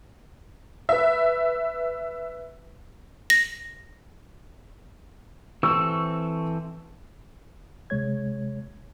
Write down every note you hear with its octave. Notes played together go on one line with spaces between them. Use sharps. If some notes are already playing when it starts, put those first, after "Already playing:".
B4 E5
A#6
E3 C4 A4 C#6 E6
C#2 C3 G#3 C#5 G#6